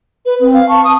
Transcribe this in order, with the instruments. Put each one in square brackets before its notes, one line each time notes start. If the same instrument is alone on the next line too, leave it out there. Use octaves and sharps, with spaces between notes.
[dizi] B4
[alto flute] C4 [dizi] B4
[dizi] F5
[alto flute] A5 [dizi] C#6
[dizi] D#6